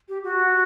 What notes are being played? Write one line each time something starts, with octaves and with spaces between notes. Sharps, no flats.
G4
F#4